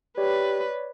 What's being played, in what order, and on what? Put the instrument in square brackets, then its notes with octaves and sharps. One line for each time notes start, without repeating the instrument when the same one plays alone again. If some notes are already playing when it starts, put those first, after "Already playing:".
[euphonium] G4 [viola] B4 [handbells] C#5 D5